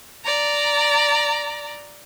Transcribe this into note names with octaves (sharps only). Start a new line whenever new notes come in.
D5 A#5